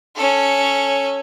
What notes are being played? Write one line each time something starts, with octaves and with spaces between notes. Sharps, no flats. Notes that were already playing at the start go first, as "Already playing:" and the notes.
C#4 A4